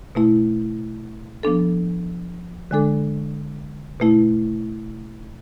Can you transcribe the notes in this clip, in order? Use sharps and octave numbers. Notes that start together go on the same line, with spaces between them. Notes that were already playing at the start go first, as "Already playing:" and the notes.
B2 A3 E4
F3 B3 D4 A4
D3 G#3 D4 A4
B2 A3 E4